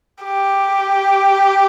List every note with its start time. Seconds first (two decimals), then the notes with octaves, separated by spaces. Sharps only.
0.24 G4